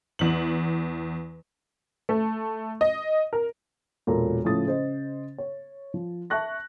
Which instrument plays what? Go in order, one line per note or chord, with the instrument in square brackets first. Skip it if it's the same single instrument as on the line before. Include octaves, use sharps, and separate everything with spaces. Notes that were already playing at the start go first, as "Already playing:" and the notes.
[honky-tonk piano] E2 F#7
A3
D#5
A#4
[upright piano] E1 A#2 A4 A#4 A#5
A2 C#3 F3 E4 D#6 A6
C#3 C5 D#5
C#5
F3
E5 A5 C#6 F#6 A#6